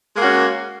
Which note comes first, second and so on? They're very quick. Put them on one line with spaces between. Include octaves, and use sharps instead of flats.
G#3 A#3 F#4 C#4